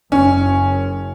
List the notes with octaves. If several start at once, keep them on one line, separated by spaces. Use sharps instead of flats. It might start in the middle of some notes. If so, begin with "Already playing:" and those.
F#1 C#4